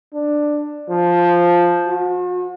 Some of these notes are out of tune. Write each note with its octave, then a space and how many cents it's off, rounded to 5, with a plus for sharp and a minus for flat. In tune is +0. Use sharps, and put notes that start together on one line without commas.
D4 +10
F3 +0
F#4 -45